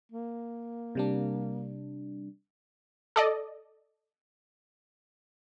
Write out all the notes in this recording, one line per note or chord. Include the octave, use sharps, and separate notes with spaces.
A#3
C3 G3 D4
A4 D5 D#5